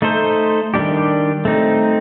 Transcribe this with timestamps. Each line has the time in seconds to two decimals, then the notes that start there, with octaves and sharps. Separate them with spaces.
0.02 A3 D#4 A4 C5
0.74 D#3 G3 D4 G4
1.45 A3 C4 D#4